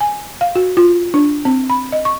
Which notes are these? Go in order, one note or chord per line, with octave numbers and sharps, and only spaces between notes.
G#5
F5
F#4
F4
D4
C4
B5
D#5
C#6